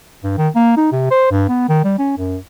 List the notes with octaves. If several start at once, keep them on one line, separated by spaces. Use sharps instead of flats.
G2
D#3
A#3
D#4
C3
C5
G2
B3
D#3
G3
C#4
F#2